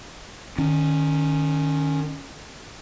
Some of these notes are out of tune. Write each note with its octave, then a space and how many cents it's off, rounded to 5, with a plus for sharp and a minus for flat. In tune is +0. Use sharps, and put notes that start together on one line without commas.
D#3 -25 C#4 +0